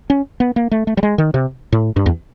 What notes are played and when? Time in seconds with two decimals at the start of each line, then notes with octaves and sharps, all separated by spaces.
0.10 C#4
0.40 B3
0.56 A#3
0.71 A3
0.87 A3
0.97 G3
1.03 G#3
1.18 D#3
1.34 C3
1.72 A2
1.96 G2
2.06 E2